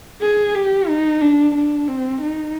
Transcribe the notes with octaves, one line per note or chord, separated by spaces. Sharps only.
G#4
G4
D#4
D4
D4
C4
D#4